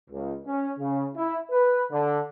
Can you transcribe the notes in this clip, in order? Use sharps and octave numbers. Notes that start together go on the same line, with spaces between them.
C#2
C#4
C#3
E4
B4
D3